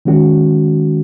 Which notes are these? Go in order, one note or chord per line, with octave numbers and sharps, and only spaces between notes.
D#3 G#3 C#4 F#4